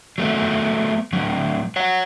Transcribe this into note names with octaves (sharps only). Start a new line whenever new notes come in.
F#3 A3 B3
A2 D3 F#3
C#5 F#5